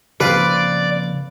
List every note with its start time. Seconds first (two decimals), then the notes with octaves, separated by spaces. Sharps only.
0.20 C#3 F3 A#3 C4 F4 B4 D5